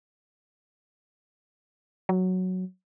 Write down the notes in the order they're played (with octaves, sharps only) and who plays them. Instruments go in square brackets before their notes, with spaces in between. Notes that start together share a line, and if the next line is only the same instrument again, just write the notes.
[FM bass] F#3